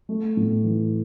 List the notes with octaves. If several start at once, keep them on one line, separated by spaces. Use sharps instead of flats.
A3
A2
E3